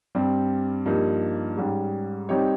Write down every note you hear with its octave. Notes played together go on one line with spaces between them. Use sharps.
G2 G3 C4
G2 F3 A#3 D#4
G#2 G3 C#4
G3 C4 D#4 G4 C#5